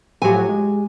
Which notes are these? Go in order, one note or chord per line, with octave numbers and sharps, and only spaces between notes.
A2 F3 F#3 G4 G#5
G#3